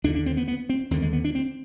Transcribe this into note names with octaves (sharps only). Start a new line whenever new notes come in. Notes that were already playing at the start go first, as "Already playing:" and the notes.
D#2 D3 D4
D4
C4
B3
B3
C4
D#2 D3 C4
G#3
B3
D4
C4